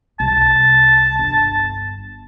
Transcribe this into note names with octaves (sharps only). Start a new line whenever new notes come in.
C2 A5
G1